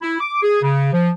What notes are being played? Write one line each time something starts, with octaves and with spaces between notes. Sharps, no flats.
E4
D6
G#4
C#3
F3